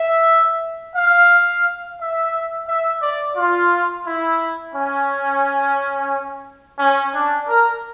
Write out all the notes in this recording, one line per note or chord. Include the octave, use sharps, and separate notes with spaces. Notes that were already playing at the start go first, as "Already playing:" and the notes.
Already playing: E5
F5
E5
E5
D5
F4
E4
C#4
C#4
D4
A#4